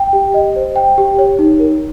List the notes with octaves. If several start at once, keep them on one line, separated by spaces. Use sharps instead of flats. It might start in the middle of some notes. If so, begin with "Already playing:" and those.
Already playing: G5
G4
D#5
C5
G5
G4
C#5
D#4
A#4